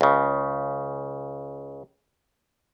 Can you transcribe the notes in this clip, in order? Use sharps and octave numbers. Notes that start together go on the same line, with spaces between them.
C#2 C#3